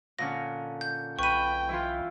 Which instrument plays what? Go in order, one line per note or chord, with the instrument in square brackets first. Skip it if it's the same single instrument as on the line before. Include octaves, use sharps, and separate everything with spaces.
[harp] A#2 D3 C#4 [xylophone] A#6
[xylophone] G6
[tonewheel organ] B1 [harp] B4 B5 [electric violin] G5 [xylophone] C#6 D#7
[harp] E3 E4 F4